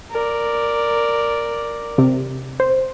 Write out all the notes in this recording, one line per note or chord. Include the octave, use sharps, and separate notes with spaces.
A#4 D5
C3
C5